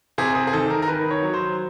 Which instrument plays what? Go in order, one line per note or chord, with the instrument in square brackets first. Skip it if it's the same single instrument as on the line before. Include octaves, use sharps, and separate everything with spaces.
[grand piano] C3 G#4
G#4
G#4
D#3 A4
A#4
A#4
D#3 B4
C#5
F#3
C5